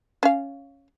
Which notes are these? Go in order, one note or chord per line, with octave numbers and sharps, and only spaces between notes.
C#4 F5